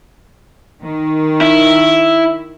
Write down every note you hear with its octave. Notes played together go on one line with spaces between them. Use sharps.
D#3
E4